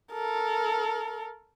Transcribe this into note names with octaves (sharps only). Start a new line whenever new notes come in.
A4 A#4